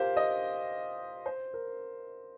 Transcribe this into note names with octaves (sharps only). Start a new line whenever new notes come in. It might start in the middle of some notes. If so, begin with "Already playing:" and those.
Already playing: F4 G4 A#4 C5
D#5
C5
A#4